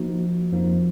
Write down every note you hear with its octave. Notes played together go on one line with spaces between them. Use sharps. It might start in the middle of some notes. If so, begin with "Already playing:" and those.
Already playing: F3 A#3 D#4 F#4
F2 F3 A#3 D#4